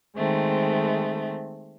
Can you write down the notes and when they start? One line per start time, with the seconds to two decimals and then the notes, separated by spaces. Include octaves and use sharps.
0.17 D#3 G#3 A3 C4